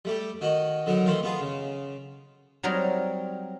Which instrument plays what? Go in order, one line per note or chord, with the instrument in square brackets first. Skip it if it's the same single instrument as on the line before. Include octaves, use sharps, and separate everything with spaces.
[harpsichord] G3 A3 G4
D#3 F#4 D#5
D3 F#3 D#4 A#4
D#3 E3 A3 F5 C6
B3 F4 G#4
C#3
[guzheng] F#3 G3 C4 D#4 A#4 C#5